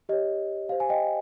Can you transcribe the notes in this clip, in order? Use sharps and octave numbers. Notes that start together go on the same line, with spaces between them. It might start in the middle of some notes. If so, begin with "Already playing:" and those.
G4 C#5 D#5
G4 C5 F5
G#5
D#5 G5